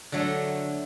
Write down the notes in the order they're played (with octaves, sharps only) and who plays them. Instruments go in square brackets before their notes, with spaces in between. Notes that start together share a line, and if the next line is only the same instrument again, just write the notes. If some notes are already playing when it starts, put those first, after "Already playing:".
[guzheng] D3 F#3 A3